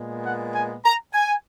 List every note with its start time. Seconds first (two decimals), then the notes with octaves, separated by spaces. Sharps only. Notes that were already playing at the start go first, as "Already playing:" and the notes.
Already playing: A#2 G#3 B3
0.23 F#5
0.53 G#5
0.84 A#5
1.14 G#5